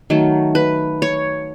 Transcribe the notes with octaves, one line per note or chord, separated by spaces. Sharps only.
D#3 F#3 A3
B4
C#5